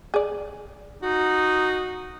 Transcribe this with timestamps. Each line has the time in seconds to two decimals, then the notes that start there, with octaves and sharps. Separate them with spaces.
0.14 G#4 D5
1.03 D#4 F#4